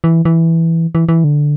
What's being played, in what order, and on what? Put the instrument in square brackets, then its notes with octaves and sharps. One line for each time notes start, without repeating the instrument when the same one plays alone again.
[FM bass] E3
E3
E3
E3
D3